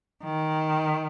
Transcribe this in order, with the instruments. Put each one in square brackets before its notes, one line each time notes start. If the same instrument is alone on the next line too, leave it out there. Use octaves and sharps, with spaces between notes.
[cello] D#3